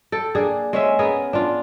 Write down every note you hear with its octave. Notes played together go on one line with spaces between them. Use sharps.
A4 G5
A#3 D4 G#4
G#3 C#4 E5
B3 G#4 A#4
D4 F4